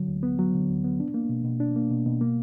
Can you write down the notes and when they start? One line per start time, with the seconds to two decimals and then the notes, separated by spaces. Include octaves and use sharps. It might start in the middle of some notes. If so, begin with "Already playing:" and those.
Already playing: D3 F#3
0.08 D2
0.23 B3
0.39 F#3
0.54 D3
0.70 D2
0.84 B3
1.00 D4
1.14 A#3
1.29 B2
1.45 B2
1.60 D4
1.76 A#3
1.91 B2
2.06 B2
2.21 A#3